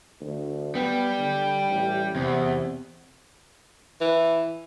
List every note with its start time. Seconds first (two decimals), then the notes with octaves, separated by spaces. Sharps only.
0.21 D2
0.75 G3 B3
1.19 D3
1.70 A1
2.15 E2 C3
4.01 E3